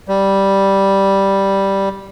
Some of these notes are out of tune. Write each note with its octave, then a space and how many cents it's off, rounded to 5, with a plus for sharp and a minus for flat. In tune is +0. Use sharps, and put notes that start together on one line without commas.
G3 -5